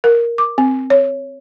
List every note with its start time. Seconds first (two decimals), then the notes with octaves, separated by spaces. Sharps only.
0.04 A#4
0.38 D6
0.58 C4
0.90 C#5